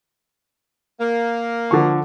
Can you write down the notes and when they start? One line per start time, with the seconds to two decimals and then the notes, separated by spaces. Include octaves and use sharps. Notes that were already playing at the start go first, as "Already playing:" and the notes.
1.00 A#3
1.71 D3 F3 C#6